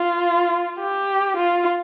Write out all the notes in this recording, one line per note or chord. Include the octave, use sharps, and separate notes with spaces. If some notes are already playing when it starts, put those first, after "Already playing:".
Already playing: F4
G4
F4